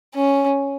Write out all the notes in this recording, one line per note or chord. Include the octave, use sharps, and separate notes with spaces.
C#4